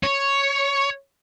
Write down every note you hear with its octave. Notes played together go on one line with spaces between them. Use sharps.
C#5